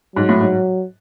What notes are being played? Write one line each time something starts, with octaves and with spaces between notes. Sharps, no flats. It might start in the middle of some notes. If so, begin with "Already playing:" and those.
G#2 F#3
A2
G#2